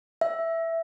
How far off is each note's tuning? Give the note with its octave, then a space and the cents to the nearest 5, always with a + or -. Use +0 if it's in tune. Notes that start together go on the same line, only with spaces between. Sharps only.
E5 +5